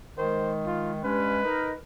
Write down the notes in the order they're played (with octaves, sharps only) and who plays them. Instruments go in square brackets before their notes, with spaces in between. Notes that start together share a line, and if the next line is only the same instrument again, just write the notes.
[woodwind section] D#3 G#3 [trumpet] C5
[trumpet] F4
[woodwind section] G2 G#3 C#4 [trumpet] B4
[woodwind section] D#4 A#4